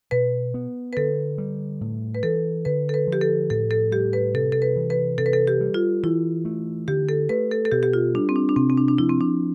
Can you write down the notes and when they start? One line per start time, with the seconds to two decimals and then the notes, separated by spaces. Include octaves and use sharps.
0.11 B2 B4
0.54 B3
0.93 B4
0.97 D3 A4
1.38 G3
1.81 A2
2.15 B4
2.23 E3 A4
2.65 D3 B4
2.89 A4
2.94 B4
3.07 F3
3.12 G4
3.21 A4
3.50 A2 A4
3.71 A4
3.91 G3 G4
4.13 B4
4.34 C3 A4
4.52 A4
4.62 B4
4.76 E3
4.90 B4
5.18 C3 A4
5.26 B4
5.33 A4
5.47 G4
5.61 G3
5.74 F4
6.03 E3 E4
6.45 A3
6.88 D3 G4
7.09 A4
7.29 A3 B4
7.51 A4
7.65 A4
7.72 B2 G4
7.83 G4
7.93 F4
8.14 G3 D4
8.29 C4
8.36 D4
8.49 D4
8.56 C3 C4
8.69 C4
8.77 D4
8.88 D4
8.98 F3 E4
9.09 C4
9.20 D4